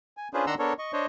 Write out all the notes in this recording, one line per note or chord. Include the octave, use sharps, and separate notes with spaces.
G#5
C#4 D4 F4 G#4 B4 C5
D#3 D4 F#5 A#5 C6 E6
B3 D4 A4 A#4 C#5
D#5 C#6
D4 C5 C#5 D#5